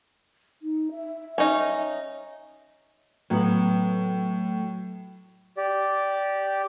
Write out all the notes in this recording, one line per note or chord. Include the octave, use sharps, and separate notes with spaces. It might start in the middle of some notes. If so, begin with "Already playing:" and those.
D#4
E5
C#4 D#4
A2 F#3 B3
G4 D5